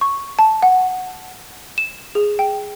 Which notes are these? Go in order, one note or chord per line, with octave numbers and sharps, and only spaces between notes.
C#6
A5
F#5
E7
G#4
G5